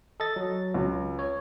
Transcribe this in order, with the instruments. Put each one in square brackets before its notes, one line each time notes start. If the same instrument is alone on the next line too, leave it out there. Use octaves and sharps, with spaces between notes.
[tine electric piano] A4 D#5 A6
F#3
[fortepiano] C#2
[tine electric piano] C#5